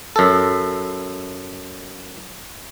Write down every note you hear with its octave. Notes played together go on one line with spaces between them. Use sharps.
F#2 A4